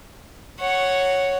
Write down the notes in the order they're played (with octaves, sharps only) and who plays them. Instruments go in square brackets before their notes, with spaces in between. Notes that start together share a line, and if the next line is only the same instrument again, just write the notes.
[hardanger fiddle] C#5 F#5